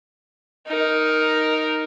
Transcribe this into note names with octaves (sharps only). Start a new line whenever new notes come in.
D#4 A#4